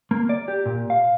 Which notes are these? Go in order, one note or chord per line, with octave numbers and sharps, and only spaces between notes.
A#3
D5
G4
A#2
F5